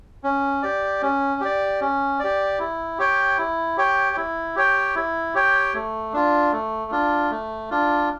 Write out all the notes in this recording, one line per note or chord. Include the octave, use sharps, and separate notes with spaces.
C#4
G4 D5
C#4
G4 D5
C#4
G4 D5
E4
G4 C#5 G5
E4
G4 C#5 G5
E4
G4 C#5 G5
E4
G4 C#5 G5
A3
D4 F4
A3
D4 F4
A3
D4 F4